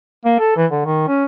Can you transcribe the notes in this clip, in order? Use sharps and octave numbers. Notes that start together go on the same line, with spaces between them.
A#3
A4
E3
D3
D#3
C#4